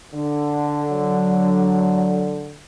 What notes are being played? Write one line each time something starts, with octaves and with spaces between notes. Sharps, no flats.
D3
F#3